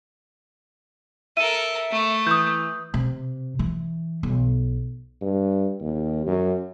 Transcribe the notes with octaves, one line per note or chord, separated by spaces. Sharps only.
A4 A#4 E5 D#7
A3
E3 D#6 G6
C3
E3
B1
G2
D#2
F#2